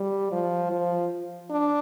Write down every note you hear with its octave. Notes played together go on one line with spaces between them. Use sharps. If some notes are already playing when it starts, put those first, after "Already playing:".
Already playing: G3
F3
F3
D4